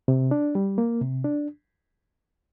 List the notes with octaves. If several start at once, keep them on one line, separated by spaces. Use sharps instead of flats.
C3
D4
G3
A#3
C3
D4